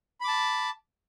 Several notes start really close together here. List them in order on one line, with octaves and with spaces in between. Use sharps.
B5 D6 A5